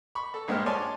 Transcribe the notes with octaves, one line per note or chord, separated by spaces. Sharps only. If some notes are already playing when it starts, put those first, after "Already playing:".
B5 C#6
A4
A#1 G2 G#3 C5 F6
C#5 D5 G#5 A5 C6